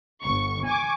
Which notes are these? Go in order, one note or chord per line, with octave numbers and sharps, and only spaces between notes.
G1 C#6
G#5 C#6 D6